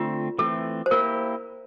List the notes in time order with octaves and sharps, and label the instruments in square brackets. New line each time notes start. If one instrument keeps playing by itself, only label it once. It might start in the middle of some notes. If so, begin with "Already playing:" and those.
Already playing: [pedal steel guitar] D3 A3 C4 [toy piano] F4
[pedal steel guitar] E3 A3 C4 [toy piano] A4
[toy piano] C5
[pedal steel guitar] A#3 E4 G4 [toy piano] A#4